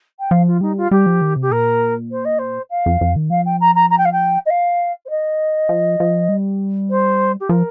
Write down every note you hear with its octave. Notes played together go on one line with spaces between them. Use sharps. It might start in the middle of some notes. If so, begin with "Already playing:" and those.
G5
F3 F5
F4
G3 D#4
F4
G3 G4
F3
D#3
C3
G4
A#2 A#4
C5
D#5
C5
F5
F2
F2
D#3
F3 F5
G5
A#5
A#5
A#5
G5
F5
G5
D#5
F5
C5
D#5
F3
F3
G3
C5
G4
F3 A#4